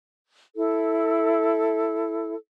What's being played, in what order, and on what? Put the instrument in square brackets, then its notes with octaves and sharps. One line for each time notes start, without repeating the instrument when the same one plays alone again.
[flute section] E4 A4